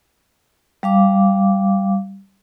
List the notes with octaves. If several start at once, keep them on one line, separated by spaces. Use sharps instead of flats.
G3 F5 D6